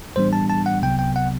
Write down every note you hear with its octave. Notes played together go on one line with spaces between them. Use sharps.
A2 E3 G3 B3 D4 C5
A5
A5
F#5
C2 C3 F#3 B3 G5
G5
F#5